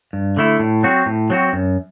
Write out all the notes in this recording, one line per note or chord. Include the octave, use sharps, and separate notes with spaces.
G2
D3 A3 E4
A2
F#3 C4 F#4
A2
F#3 C4 F#4
F#2